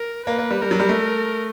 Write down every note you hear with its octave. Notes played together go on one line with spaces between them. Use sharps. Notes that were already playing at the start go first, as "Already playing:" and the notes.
Already playing: A#4
A#3 B4
A#3
G3
G3 A#4
F#3
G3
A3